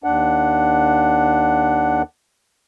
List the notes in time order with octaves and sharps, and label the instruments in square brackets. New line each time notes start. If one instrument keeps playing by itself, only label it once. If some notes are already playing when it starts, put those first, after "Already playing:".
[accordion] D#2 D4 F#5